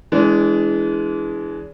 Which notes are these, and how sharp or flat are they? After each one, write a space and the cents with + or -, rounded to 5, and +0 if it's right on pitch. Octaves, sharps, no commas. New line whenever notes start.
E3 +0 G#3 +0 D4 -35